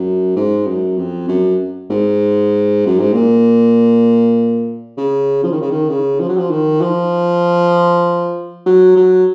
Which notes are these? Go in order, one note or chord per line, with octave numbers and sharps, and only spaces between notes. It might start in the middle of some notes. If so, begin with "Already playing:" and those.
Already playing: F#2
G#2
F#2
F2
F#2
G#2
F#2
G#2
A#2
C#3
F3
D#3
C#3
D#3
C#3
F3
F#3
F3
D#3
F3
F#3
F#3